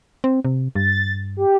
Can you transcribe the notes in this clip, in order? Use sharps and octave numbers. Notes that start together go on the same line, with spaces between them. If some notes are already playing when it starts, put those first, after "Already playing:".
C4
C3
G2 A6
G4